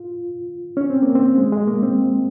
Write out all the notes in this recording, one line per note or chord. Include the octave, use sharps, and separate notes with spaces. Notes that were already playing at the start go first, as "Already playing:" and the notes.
Already playing: F4
C#4
C4
A#3
C4
G#3
G#3
A#3
C4